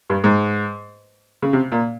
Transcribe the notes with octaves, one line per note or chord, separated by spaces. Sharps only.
G2
G#2
C#3
C3
A#2